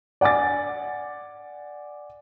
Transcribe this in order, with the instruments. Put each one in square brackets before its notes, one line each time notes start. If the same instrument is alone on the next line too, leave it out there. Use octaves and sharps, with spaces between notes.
[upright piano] D5 F#5 G#5 D6 A6